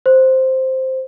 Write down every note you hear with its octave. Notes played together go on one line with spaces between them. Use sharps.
C5